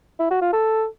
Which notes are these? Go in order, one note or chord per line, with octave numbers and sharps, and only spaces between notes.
E4
F#4
F4
A4